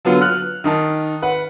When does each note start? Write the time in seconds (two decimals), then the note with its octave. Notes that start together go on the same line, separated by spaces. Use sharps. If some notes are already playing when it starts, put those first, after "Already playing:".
0.05 D3 F#3 B3 F4
0.21 F6 F#6
0.64 D#3 D#4 A5
1.22 B4 F#5